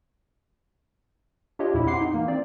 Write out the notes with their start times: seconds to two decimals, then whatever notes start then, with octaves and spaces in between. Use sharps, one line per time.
1.59 D4 F4 G4 C#5 D#5
1.74 E2 A#2 E4
1.87 C4 F#5 C6 D6 C7
2.01 D#4
2.14 E3 A#3
2.28 C4 D5